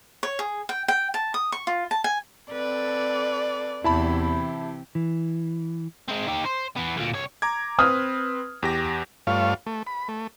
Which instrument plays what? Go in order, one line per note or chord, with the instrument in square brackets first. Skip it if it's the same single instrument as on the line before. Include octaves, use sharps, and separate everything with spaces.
[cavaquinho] C#5
G#4
G5
G5
A5
D#6
C#6
F4
A5
G#5
[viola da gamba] C4 A4 B4 [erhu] D5
[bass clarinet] E2 [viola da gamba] C3 E3 G4 [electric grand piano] E4 A5 B5
[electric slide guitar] E3
[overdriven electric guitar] G#3 C4
D#3 G4
C5
E3 B3
D2 A#2
C2 C#5
[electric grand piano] A#5 D6 G#6
[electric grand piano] C4 B4 [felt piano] D#6 F6
[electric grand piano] E2 G4 A#6
[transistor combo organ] G2 A3 F4 C#5 F5
A3
B5
A3